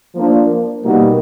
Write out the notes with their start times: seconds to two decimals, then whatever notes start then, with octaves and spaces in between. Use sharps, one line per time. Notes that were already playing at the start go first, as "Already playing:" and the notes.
0.15 F3 A#3 D4
0.83 B2 G3 A#3 D#4 F#4